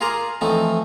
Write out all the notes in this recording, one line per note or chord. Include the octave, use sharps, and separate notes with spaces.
F4 G#4 A#4 A#5 C6 D6
E3 F3 A3 C4 D#4